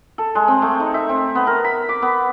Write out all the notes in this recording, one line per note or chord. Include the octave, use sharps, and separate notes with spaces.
A4
G#3
C4
A3
D#4
E5
C4
B3
A#4
B5
D6
B3